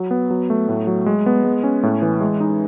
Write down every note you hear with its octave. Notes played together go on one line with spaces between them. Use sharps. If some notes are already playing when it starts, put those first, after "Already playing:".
Already playing: F#3
B3
F#3
A3
A2
F#3
G#3
B3
G#3
C#4
A2
E3
G#3
D#4